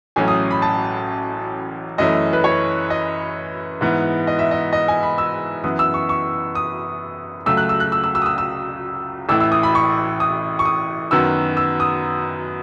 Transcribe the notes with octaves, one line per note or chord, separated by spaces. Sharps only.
A1 A2 F#3 C#4 G#5
D#6
B5
A5
F#2 E3 A3 C#4 D#5
B4
C#5
D#5
G#2 E3 B3
D#5
E5
D#5
D#5
G#5
B5
E6
F#2 E3 B3 D#6
E6
C#6
C#6
D#6
C#2 C#3 F#3 A3 E6
F#6
E6
F#6
E6
E6
E6
D#6
E6
E6
A1 A2 E3 E6
E6
D#6
B5
C#6
D#6
C#6
D#6
F#2 D#3 F#3 B3 E6
E6
D#6